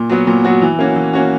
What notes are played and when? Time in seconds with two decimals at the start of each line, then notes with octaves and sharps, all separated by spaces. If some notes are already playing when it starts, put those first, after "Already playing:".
Already playing: A#2
0.09 F#3 B3 F#4
0.27 A#2
0.44 F#3 B3 F#4
0.62 E3
0.79 A#3 C#4 F#4
0.96 E3
1.13 A#3 C#4 F#4